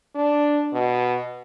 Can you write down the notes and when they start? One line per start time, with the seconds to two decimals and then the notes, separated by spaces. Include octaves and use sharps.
0.15 D4
0.73 B2